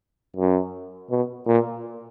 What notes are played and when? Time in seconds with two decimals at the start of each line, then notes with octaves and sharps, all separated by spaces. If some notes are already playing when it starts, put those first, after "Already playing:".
0.36 F#2
1.11 B2
1.47 A#2